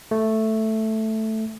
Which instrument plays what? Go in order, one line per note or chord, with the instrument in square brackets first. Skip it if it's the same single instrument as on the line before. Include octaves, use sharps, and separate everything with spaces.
[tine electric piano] A3